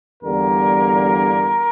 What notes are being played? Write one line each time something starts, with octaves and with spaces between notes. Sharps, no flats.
E2 D3 G3 A#3 A#4